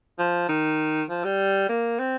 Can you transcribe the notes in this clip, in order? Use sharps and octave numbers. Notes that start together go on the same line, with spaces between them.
F3
D#3
F3
G3
A#3
C4